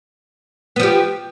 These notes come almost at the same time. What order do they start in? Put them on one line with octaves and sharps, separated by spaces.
B3 F3 G4